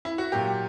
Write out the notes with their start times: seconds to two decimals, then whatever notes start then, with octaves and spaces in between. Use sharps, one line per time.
0.05 E4
0.18 F#4
0.32 A#2 F#3 A#3 G4